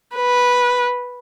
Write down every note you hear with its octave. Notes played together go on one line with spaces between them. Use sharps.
B4